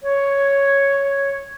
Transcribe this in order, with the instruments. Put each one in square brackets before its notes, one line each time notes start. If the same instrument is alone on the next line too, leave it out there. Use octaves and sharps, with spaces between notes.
[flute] C#5